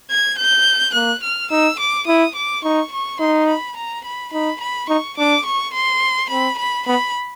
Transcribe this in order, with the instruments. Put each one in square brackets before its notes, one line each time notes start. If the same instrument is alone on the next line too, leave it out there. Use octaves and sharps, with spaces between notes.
[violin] G#6
G6
[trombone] A#3 [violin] F#6
[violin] F6
[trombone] D#4 [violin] E6
[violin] D6
[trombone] E4 [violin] D#6
[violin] D6
[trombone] D#4 [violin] C#6
[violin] C#6
[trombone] D#4 [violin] C6
[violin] B5
A#5
B5
[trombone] D#4 [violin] B5
[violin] B5
[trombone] D#4 [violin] C#6
[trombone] D4 [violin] D6
[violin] C#6
C6
[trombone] C4 [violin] B5
[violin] B5
[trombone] B3 [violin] B5